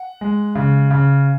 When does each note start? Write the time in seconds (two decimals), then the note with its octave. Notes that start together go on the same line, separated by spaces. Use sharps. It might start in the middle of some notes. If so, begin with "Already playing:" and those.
Already playing: F#5
0.21 G#3
0.55 C#3
0.91 C#3